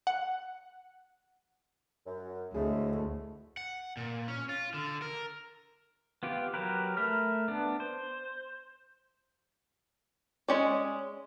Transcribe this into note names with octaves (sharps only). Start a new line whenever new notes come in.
F#5
F#2
D2 A2 G#3 A3 G#4
F#5
A#2
C#4
F4
D3
A#4
B3 F4 G4
F#3 G4 A#4 B4
A3 A#4 B5 F6
B3 D4
C5
G#3 C#4 D5